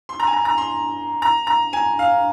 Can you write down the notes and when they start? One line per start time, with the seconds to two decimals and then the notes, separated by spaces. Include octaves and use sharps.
0.09 C6
0.20 A#5
0.27 G#5
0.33 A#5
0.45 A#5
0.58 C6
1.22 A#5
1.47 A#5
1.73 G#5
1.99 F5